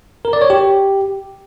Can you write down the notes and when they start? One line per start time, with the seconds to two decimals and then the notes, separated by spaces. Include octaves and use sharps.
0.25 A#4
0.33 D5
0.42 C#5
0.50 G4